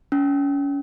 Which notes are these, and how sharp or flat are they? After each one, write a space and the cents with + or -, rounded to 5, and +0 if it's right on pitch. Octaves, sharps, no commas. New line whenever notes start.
C#4 +30